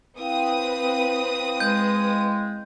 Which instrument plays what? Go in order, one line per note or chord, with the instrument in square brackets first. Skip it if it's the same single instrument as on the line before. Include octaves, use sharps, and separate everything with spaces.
[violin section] C4 B4 D#6 [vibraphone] E4 F5 G5
[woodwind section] G#3 [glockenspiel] G6